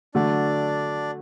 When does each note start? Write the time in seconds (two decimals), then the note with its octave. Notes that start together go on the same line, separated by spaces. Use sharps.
0.15 D3 F#3 A3 D4 D5